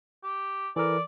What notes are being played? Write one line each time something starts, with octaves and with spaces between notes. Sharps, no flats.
G4
E3 A4 A#4 D5